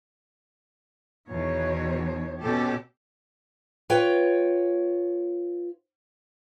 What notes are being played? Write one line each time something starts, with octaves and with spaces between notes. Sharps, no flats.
E2 B2 D#3 C#5
B2 C4 C#4 G4 A4
F4 B4 C#5 G5